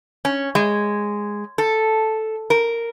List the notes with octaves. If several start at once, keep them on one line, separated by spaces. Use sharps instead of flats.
C#4
G#3
A4
A#4